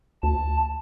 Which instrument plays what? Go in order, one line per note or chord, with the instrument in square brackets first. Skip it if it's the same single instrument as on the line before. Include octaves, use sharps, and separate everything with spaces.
[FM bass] D2 [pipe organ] A5